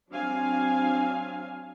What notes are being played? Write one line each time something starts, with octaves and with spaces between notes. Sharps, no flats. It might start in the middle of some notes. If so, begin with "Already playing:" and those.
F#3 C4 D4 F5 G#5